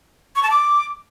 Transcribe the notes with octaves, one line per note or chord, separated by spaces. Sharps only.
C#6
A5
D6